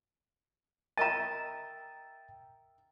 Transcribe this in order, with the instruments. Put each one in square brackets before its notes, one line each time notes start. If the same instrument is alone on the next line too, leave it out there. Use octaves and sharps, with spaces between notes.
[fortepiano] A#4 D#5 E5 [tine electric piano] G5 A6 [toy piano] A5 A#5